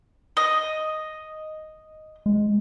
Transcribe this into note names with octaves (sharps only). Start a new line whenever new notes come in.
D#5
G#3